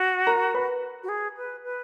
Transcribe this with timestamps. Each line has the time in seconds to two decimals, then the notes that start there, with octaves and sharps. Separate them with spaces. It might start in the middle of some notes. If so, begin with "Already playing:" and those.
Already playing: F#4
0.27 A#4 A#5
0.54 B4 B5
1.03 F#4
1.09 G#4
1.37 B4
1.64 B4